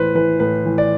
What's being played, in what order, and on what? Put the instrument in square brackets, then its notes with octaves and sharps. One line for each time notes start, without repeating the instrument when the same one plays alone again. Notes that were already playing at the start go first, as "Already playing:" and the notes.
Already playing: [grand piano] A2 E3 B4 C5
E3 B4
A2 B4
E3
D5